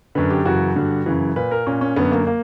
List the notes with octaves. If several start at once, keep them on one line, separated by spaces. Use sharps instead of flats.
F#2 D3 B4
G4
F#2 C#3 E3 F#4
G2 D3
F#2 C#3 E3
A#2 B4
A#4
A#2 C#4
C#4
F#2 D3 B3
A#3
A#3